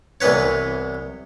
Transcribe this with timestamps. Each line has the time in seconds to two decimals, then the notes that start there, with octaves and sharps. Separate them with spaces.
0.21 C2 E3 B3 B4 C#5